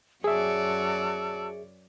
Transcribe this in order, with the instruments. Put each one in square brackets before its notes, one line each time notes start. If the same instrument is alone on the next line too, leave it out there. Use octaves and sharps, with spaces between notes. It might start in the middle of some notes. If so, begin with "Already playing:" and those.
[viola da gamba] F#2 C#5 D5 [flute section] F#4 A5 E6 [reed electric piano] G#4 E5